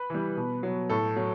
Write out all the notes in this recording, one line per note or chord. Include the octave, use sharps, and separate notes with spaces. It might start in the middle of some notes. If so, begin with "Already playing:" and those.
Already playing: B4
E3 G3
B2
F#3
A2 A4
F#3